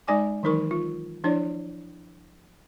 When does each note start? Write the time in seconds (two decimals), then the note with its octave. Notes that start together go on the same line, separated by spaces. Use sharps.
0.08 G#3 D#4 D5 G#5 D6
0.43 D#3 E3 F#3 D#4 A#4 C#6
0.71 F4
1.24 F3 D4 E4 C#5 D5